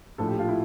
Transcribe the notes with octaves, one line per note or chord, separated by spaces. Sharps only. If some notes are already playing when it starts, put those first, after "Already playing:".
A#1 A2 F3 A4
G4
F4
E4